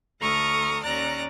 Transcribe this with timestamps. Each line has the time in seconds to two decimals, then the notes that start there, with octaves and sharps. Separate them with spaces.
0.19 D2 A4 A#5 C#6 D#6 F6
0.83 D#2 C#4 D5 A#5 F#6 A#6